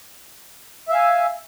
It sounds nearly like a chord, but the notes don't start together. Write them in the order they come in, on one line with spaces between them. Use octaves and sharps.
E5 F5 G#5